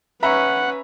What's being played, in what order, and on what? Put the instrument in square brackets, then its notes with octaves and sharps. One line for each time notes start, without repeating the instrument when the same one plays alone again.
[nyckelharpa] C#4 [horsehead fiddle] B4 [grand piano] E5 A#5 B5 [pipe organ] F#5